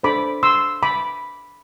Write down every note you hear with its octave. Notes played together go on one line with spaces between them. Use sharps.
D4 A4 C5 B5 D6
C6 E6
B5 D6